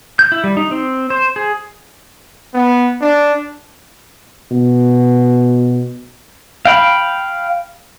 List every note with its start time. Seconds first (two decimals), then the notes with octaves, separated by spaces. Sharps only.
0.19 G6
0.32 E4
0.44 G3
0.57 D#4
0.71 C4
1.10 C5
1.36 G#4
2.54 B3
3.01 D4
4.51 B2
6.65 F5 G5 B5